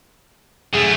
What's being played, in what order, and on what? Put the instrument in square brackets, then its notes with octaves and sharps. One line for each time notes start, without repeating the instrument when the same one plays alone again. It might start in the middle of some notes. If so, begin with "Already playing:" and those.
[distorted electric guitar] F#2 A3 [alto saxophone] G#4